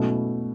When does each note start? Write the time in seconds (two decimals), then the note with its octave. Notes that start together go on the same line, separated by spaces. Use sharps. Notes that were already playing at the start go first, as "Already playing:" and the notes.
Already playing: B2 F#3 A3 C#4 E4